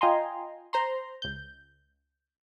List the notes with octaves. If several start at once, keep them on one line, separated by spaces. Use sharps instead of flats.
F4 D#5 G5 G#5 A#5 C6
C5 A#5 C6
C#2 G6